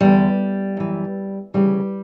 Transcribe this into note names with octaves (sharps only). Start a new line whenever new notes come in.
E2 D3 G3
F#2 E3
D2 C#3 E3 G3